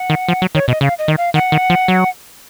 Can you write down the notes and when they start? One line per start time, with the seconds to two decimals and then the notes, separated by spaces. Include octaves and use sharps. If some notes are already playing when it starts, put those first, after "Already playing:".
Already playing: F#5
0.10 D#3
0.28 F3
0.42 F#3
0.55 D#3 C#5
0.68 B2 D#5
0.81 C#3 F5
0.99 D#5
1.08 D#3
1.18 F5
1.34 D#3 F#5
1.52 D#3
1.70 F3
1.88 F#3